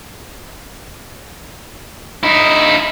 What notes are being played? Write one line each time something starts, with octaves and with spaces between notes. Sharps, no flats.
D#4 E4